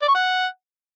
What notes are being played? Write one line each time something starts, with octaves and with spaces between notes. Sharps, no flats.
D5
C#6
F#5